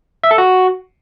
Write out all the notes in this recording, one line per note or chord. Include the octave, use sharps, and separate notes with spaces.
E5
A4
F#4